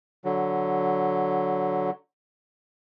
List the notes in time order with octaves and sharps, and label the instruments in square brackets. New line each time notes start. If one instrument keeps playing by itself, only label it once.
[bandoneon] D3 F#3